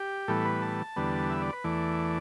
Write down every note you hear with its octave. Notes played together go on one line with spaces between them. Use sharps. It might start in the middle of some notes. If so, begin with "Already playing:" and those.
Already playing: G4
A2 E3 G3 B3 A4
B4
A5
E2 D3 G3 B3
E5
D5
B4
E2 E3 A3 D5